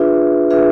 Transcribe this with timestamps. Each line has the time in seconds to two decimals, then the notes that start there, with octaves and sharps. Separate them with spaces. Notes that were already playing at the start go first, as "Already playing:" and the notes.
Already playing: D4 F4 G#4 B4 E5
0.51 D4 F4 G#4 B4 E5